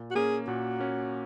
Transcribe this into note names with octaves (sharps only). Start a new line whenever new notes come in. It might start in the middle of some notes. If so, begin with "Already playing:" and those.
Already playing: A#2
F#4
A#3 C#4 G#4
A#2 F#4
A#3 C#4